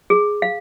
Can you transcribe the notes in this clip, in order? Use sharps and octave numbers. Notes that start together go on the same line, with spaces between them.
G#4
F5